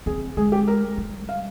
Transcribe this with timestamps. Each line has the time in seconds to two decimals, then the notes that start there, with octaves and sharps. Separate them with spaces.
0.06 C4 G#4
0.37 G#3 G#4
0.52 G4
0.68 A#4
0.98 G3
1.29 F5